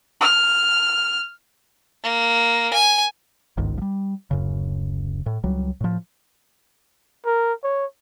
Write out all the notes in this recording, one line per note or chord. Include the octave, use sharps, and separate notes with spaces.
F6
A#3
G#5
G1 C#2 G#2 D#3
F3 G3
D1 F#2 C#3
A2
C#2 F#3 G3
A2 F3
A#4
C#5